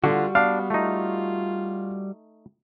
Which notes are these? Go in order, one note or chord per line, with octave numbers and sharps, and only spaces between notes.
D3 G3 F4 F#4
B3 D4 F5
A3 D#4 F4